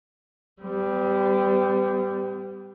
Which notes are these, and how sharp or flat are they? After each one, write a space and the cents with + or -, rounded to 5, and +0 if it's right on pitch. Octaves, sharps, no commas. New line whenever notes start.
G3 +0 B3 +45